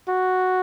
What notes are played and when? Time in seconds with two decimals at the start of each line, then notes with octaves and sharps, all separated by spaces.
0.09 F#4